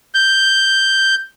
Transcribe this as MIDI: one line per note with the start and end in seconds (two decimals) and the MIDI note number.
0.14 1.15 91